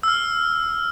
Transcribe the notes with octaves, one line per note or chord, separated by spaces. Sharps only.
E6 F6